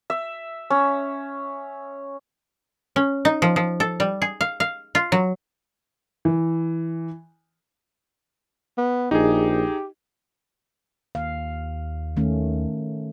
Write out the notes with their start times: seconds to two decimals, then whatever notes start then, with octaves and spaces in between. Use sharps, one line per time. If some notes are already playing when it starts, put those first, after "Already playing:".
0.10 E5
0.70 C#4
2.96 C#4
3.25 D#4
3.42 F3
3.56 F3
3.80 A4
4.00 G3
4.22 G#4
4.41 F5
4.60 F5
4.95 F4
5.12 F#3
6.25 E3
8.78 B3
9.11 A#1 D#4 G4 G#4
11.15 D#2 F5
12.16 D#3 A3 C#4